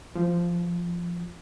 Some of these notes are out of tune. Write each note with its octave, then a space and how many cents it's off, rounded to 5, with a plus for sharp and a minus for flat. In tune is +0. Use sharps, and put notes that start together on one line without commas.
F3 -10